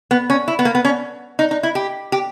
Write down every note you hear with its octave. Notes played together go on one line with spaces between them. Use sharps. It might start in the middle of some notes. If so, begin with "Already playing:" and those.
B3
C#4
E4
B3
A#3
B3
C#4
D#4
D#4
E4
G4
G4